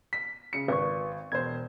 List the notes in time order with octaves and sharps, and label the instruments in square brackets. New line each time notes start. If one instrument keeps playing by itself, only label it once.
[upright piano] B6
C#3 C#7
[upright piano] G#1 [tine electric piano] B4 C#6
[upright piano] E1 C5 [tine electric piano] G#6